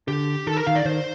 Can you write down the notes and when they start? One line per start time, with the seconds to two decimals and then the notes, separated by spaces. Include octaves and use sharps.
0.08 D3 G4
0.47 D#3 A4
0.57 A#4
0.67 D#3 F5
0.75 D5
0.85 D#3 C5